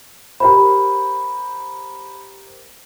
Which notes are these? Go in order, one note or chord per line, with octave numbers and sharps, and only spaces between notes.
G4 A#4 C5 B5